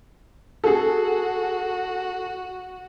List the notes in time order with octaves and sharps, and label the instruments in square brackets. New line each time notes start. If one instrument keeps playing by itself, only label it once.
[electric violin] F#4 [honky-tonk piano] G#4 A4